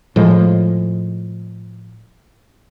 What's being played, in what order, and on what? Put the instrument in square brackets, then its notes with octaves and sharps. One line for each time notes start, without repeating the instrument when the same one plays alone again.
[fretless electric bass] A2 F3 G#3